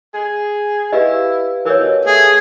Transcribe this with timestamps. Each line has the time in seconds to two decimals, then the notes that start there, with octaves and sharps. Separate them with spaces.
0.14 G#4
0.93 E4 G4 B4 D#5 F5
1.65 E3 A#4 C#5
1.79 B2
2.05 A3 G#4